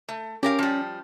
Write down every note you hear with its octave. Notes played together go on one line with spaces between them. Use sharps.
A3
C#4 G4 A#4 F5
F3 G3